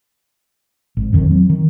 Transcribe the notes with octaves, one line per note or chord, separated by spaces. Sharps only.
G#1
A1 F2 D#3
F#3 C4
D#3